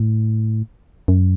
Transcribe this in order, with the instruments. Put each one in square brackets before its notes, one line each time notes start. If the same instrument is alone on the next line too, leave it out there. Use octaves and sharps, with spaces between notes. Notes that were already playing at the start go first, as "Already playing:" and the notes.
Already playing: [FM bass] A2
F#2